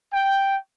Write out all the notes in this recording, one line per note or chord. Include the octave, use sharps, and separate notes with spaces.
G5